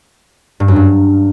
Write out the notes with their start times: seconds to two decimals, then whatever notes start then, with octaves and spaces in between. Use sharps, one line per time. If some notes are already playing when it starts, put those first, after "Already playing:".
0.60 G2
0.68 F#2
0.76 G2